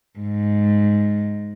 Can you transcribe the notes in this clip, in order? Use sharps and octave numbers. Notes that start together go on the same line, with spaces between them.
G#2